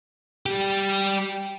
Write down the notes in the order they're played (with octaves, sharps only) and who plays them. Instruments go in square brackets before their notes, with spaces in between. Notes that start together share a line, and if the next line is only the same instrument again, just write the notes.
[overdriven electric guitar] G3 G4